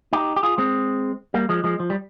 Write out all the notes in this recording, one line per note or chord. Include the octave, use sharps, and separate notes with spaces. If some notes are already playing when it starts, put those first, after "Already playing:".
D#4 G4
G4
F4 G#4
G#3 C4
G3 A#3
F3 G#3
F3 G#3
F3
G3